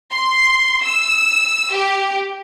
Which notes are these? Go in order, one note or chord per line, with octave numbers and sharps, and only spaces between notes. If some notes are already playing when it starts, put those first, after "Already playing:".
C6
E6
G4